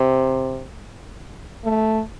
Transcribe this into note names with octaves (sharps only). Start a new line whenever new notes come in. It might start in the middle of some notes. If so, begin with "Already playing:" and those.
Already playing: C3
A3